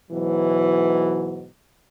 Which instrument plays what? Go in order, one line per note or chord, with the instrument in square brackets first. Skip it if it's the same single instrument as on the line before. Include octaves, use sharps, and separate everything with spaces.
[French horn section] G#2 B2 E3 F#3